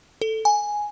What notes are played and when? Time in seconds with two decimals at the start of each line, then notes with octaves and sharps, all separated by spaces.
0.21 A4
0.45 G#5